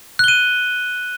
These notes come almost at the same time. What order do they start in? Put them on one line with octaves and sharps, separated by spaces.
F#6 G7 D#7